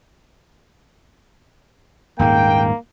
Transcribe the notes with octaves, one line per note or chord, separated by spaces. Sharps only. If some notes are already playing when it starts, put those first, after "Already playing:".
D#1 G#2 G#3 A#3 G5